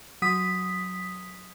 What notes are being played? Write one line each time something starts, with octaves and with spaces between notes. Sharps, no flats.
F#3 D#6 B6